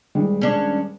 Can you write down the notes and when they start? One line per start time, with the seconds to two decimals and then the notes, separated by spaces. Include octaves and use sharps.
0.15 D#1 G3 G#3
0.41 C#4 D4